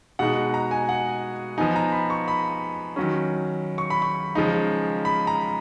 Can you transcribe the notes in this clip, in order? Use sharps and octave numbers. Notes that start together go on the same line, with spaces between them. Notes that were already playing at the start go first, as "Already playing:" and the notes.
B2 G#3 D#4 F#5
A#5
G#5
F#5
F3 B3 D#4 G#5
A#5
B5
C#6
B5
D#3 F#3 C#4
C#6
B5
C#6
C#3 F3 G#3 D#4
B5
A#5